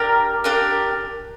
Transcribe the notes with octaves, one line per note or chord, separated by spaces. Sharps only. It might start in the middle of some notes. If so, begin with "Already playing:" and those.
Already playing: D4 G4 A#4
D4 G4 A#4